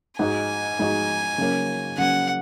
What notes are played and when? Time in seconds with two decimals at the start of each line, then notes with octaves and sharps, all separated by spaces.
0.19 G#2 G#3 D#4 F#4 G#5
0.79 G#2 G#3 D#4 F#4
1.38 C#3 F#3 A#3 C#4
1.98 C#3 F#3 A#3 C#4 F#5